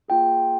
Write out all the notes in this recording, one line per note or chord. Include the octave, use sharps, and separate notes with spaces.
A#3 F4 G#4 G5